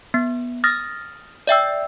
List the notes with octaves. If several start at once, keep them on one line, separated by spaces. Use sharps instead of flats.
B3
D#6 F6 A6 A#6
D5 E5 G5 E6